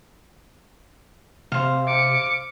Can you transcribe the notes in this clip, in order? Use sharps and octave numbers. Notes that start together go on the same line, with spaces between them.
C3 C5 F5
D6 C#7